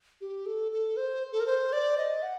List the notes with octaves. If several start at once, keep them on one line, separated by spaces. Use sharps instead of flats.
G4
A4
A4
C5
A4
A#4
C5
D5
D#5
F#5